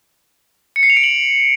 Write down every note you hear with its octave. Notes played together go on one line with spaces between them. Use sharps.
C#7
C7
F7
D7
F#7